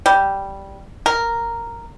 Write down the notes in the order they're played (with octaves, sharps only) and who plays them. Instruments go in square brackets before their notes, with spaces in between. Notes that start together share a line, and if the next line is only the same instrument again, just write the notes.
[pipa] G3
A#4